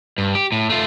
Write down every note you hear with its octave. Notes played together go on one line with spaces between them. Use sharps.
G2
G4
A2
A3 F4